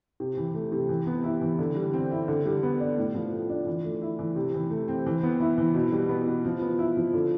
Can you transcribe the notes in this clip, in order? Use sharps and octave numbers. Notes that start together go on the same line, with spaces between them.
C3
E3
A3
C3
E3
B3
E4
E3
D3
G3
C4
E4
D3
G3
B3
D4
A2
F3
A3
D4
E3
A3
E4
E3
C3
E3
A3
C4
E3
B3
E4
E3
B2
G3
B3
B2
F3
B3
E4
F3
D3